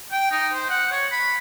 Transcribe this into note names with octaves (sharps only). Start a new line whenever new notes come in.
G5
D#4
C5
F#5
C#5
B5